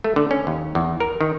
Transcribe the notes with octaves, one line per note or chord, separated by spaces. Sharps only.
A3
D3
C#4
D#2
E2
A#4
D#3